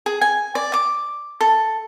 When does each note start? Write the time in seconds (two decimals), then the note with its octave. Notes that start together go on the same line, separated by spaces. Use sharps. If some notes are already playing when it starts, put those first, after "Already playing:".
0.06 G#4
0.21 G#5
0.55 D5
0.74 D6
1.41 A4